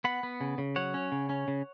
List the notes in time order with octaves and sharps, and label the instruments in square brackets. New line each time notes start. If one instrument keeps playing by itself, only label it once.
[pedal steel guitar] B3 F#5 B5
B3
C#3
C#3
F#3 C#5 F#5
C#4
C#3
C#4
C#3